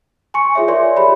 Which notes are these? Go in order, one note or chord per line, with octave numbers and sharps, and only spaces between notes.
G#5 C6 C#6 C#7
F4 G#4 C#5 E5
A#4 C#5 D5 E5 C6
G4 C#5 B5